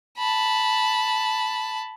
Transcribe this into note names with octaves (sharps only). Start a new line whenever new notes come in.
A5 B5